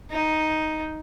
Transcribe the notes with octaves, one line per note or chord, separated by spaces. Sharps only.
D#4